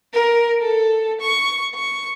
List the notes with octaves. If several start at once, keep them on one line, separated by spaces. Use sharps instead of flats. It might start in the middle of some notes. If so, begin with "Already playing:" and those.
A#4
A4
C#6
C#6